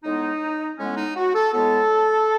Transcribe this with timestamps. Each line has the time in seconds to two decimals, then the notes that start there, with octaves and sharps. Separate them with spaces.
0.03 A2 G#3 B3 D#4
0.78 A2 G#3 B3 C#4
0.97 D#4
1.16 F#4
1.34 A4
1.53 A2 G#3 B3 A4